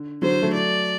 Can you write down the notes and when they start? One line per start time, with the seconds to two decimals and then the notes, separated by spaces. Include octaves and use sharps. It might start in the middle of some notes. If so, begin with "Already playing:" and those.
Already playing: D3
0.22 D3 F#3 C5
0.42 F#3 A3
0.53 D5